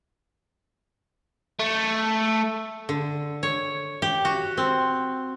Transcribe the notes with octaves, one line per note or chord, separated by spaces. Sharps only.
A3
D3
C#5
G4
F#4
C4